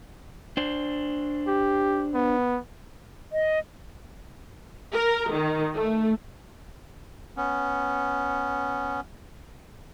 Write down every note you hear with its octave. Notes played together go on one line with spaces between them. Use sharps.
D4 C5
G4
B3
D#5
A#4
D#3
A3
B3 C#4